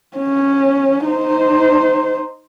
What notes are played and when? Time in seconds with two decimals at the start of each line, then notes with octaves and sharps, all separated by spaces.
0.17 C#4
1.06 D#4 C5